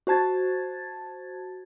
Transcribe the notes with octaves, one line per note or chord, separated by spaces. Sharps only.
F#4 C5 A5 G#6 A6